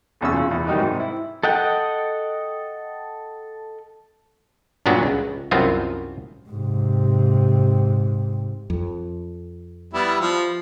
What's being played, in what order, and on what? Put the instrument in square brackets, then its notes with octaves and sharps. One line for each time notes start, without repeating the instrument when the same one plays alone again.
[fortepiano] B1 E2 C#4 E6
A#2 C#3
E2
D#3 F#3 G3 D#4 F#4
G#2 C3
E4
[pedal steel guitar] A4 D#5 F#5 G5
[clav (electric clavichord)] G2 A#2 F#3 B3 D4 F#4
C#2
C2 F#2 B3 C4 F4
[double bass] G#2 C3
[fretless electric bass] F2
[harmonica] G3 B3 E4
F3